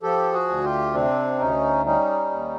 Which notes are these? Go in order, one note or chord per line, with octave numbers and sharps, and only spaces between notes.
F3 G4 A4
F#4 G#4
D2
F4 G4
C3 C4 D4
D2 C#4 D#4
G3 C#4 D#4
D#2